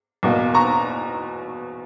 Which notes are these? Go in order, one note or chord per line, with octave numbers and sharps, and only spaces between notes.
E2 B2 A#3
A#5 C#6